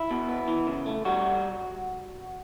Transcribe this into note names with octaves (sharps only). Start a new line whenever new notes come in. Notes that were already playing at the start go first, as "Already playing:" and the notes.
Already playing: E4
B2
B3
E3
C#3
A3
G3 F#4